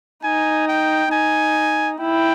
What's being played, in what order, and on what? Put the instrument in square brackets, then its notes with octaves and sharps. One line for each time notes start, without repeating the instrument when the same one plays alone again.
[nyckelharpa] D#4 [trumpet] G#5
[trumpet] G5
[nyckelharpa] D#4 [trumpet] G#5
[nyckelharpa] E4 [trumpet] G5